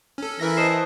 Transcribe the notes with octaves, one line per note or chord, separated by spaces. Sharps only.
C#4 A4
E3 A#4 E5 A#6
C5 D#5 A5